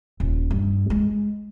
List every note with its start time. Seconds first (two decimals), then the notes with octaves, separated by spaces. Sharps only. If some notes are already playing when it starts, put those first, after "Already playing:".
0.20 D#1
0.51 G2
0.90 G#3